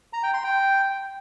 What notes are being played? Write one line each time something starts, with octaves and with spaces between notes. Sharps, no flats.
A#5
G5
C6
G5